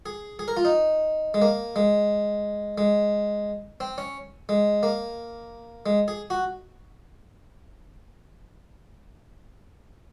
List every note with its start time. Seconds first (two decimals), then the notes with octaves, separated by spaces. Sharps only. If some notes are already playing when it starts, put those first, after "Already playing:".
0.06 G#4
0.39 G#4
0.48 A#4
0.57 F4
0.65 D#4
1.34 G#3
1.42 A#3
1.76 G#3
2.78 G#3
3.80 C4
3.98 C#4
4.49 G#3
4.83 A#3
5.86 G#3
6.08 G#4
6.30 F#4